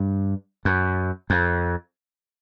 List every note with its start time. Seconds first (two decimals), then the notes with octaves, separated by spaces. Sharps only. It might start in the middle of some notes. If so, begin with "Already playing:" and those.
Already playing: G2
0.65 F#2
1.30 F2